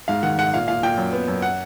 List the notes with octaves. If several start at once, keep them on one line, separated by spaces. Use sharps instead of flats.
G#2 F5
D#3 F#5
G#2 F#5
A#2 F5
A#2 F5
A#2 G5
F#2
B3
F#2
F#5